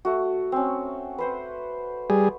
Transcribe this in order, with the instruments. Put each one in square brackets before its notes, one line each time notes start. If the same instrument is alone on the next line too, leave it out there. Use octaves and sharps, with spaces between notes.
[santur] A3 F#4
C4 C#4
B4 C5 F#5
[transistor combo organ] G3 G#4